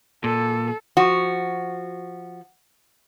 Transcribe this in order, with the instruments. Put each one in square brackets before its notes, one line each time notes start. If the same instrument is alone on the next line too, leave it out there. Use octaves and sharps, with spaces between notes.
[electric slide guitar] A#2 [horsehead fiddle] A4
[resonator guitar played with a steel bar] F3 F#4